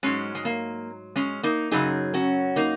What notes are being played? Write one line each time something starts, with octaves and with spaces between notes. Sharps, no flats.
G#2 F#3 G#3 C#4
G#3
A#3
G#3 C#4
A#3 D#4
F#2 C#3 F#3 D#4 G#4
C#4 F#4
A#3 D#4